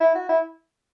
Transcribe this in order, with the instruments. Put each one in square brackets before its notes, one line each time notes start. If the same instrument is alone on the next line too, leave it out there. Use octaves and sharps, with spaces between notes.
[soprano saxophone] E4
F#4
E4